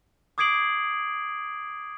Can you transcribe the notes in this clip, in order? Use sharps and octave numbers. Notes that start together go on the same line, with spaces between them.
D6 D#6 G#6 C7 D7 F#7